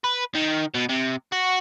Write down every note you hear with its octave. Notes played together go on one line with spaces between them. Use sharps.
B4
D#3
B2
C3
F#4